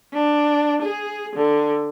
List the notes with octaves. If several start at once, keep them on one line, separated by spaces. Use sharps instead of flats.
D4
G#4
D3